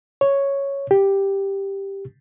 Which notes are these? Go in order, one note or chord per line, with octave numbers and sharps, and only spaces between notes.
C#5
G4